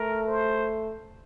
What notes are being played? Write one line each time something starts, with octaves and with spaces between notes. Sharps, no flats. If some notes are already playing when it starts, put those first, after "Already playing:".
Already playing: A3 A#4
C5